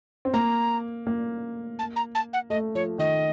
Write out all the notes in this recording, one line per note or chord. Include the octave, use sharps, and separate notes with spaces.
C4
A#3 A#5
A#3
A5
A#5
A5
F#5
A3 D#5
F3 C#5
D#3 D#5